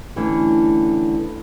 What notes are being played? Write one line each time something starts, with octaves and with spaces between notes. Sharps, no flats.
D3 E3 G3 A3 C#4 D4